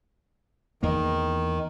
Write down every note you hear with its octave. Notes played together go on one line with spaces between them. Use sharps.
E2 D#3 A#3